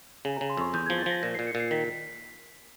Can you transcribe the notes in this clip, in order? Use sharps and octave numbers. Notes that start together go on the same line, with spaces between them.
C#3 G#5
A#5
C#3
C6
F2 C#6
E2 G6
G#6
F3
A6
F3 A#6
A#2 A#6
C7
A#2
C#7
A#2
C7
D#3 B6